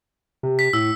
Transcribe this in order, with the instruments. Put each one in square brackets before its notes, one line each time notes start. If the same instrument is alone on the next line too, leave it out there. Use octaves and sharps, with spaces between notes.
[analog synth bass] C3
[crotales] B6
[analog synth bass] A2 [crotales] E6